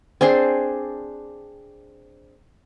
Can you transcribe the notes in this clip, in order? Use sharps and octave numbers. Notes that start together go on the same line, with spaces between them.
C4 D4 G#4 C6